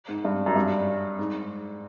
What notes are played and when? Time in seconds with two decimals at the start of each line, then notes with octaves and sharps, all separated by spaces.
0.09 G#2
0.25 G2
0.46 F#2
0.56 G2
1.19 G#2